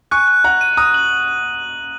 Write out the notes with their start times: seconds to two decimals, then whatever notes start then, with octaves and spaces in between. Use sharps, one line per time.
0.11 G#5 C#6 F#6
0.28 F#6
0.44 F#5 A#5 F#6
0.61 D#7
0.77 A#5 D#6 F#6
0.94 F#7